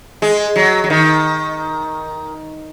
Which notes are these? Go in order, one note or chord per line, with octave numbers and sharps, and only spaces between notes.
G#3
F#3
F#3
D#3